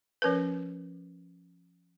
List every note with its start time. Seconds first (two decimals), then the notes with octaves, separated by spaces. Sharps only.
0.22 F3 C#4 A#4 B4